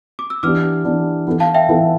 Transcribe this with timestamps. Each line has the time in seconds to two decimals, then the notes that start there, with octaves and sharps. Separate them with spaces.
0.19 D6
0.30 E6
0.43 E3 B3 D4 G4 D6 F6
0.85 E3 B3 D4 G4
1.27 E3 B3 E4 A4
1.40 F5 A5
1.54 E5 G5
1.69 E3 B3 E4 A4